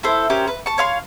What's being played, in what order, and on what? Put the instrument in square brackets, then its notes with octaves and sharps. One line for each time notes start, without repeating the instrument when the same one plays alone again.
[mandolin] E4 A4 C5
C#4 G4 A#4 C5
B4
A5 C#6
C#5 F5 C6